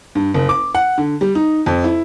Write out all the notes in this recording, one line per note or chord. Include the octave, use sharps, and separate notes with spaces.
G2
F#1
D6
F#5
D3
G3
D#4
F2
E4